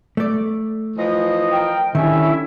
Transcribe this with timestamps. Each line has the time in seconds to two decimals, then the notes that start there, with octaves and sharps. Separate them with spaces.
0.17 A3 D5
0.97 E3 F3 D#5
1.51 A#4 G5
1.95 D3 D#3 G3 C#4 E4 E5